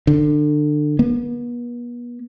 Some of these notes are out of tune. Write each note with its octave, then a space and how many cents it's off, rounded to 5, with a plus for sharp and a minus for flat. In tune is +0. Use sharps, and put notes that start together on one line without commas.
D3 +25
B3 -40